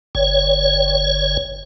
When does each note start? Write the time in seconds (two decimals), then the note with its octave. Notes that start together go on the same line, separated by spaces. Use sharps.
0.15 G1 C#5